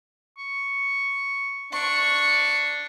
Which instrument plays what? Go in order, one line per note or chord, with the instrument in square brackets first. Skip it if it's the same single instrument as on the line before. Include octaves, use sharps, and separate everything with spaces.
[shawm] C#6
[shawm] D4 [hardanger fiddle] C#6